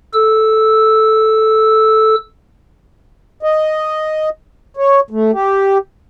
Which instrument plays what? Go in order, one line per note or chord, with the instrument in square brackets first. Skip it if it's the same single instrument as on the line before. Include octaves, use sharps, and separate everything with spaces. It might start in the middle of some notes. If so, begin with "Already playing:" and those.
[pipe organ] A4 E6
[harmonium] D#5
C#5
A3
G4